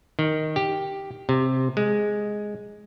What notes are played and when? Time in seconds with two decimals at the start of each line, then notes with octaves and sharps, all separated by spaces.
0.19 D#3
0.56 G4
1.29 C3
1.77 G#3